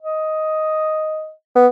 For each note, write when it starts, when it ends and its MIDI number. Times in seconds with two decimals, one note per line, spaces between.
0.02 1.32 75
1.55 1.67 59